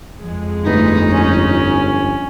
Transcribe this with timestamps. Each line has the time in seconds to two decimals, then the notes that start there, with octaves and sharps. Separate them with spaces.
0.20 F2 F3 G#3
0.64 G1 A3 B3 D#4
1.10 C#4